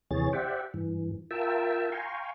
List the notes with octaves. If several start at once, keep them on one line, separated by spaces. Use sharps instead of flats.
D#2 C3 E3 G#4 C#5 A6
G4 C5 D5 E5 F#5 G5
G2 E3
F4 A#4 E5 G5 A5 E6
F5 G5 G#5 A#5 C6 C#6